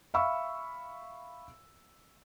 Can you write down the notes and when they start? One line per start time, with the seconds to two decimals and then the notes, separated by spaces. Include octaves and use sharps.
0.14 E5 F5 B5 C#6 E6